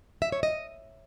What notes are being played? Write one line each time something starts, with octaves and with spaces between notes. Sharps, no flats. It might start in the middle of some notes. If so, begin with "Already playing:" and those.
E5
C#5
D#5